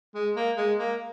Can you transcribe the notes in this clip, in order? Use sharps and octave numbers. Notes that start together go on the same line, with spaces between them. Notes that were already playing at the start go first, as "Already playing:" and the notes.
G#3
A#3
G#3
A#3